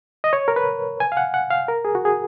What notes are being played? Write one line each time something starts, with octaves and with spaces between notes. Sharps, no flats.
D#5
C#5
A#4
B4
G#5
F5
F#5
F#5
F5
A#4
G#4
F#4
G#4